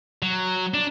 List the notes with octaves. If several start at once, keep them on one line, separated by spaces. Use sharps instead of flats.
F#3
D4